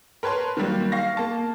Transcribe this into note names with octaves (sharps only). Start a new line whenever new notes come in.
A#4 B4 C#5 A5 C6
D#3 F#3 G3 A#3
F5 C#6 F6 A#6
A#3 A5